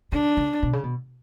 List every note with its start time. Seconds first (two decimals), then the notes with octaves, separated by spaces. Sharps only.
0.12 C#3 D4
0.37 C#3
0.63 B2
0.73 C#3
0.84 B2